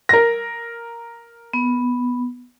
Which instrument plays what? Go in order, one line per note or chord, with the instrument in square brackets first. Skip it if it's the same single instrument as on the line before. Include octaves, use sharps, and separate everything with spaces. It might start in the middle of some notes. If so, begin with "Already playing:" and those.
[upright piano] A#4 A#6
[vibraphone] B3